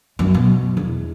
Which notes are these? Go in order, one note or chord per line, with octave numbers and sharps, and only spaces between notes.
F#2
B2
E2